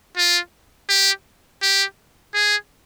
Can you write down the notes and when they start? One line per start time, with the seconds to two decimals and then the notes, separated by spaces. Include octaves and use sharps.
0.17 F4
0.89 G4
1.62 G4
2.34 G#4